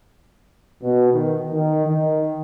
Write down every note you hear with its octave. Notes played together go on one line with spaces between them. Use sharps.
B2
D#3
D#3
D#3